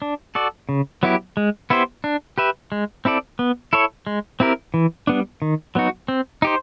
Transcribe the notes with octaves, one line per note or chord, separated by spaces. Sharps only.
D4
F#4 A4 D5
C#3
F#3 B3 E4 G4
G#3
B3 E4 G4 C5
D4
G4 B4 E5
G#3
C4 E4 A4 D5
B3
E4 A4 C#5
G#3
C4 E4 G4 A#4
E3
G3 B3 D4
D#3
F#3 B3 D#4 F#4
C4
D#4 G4 C5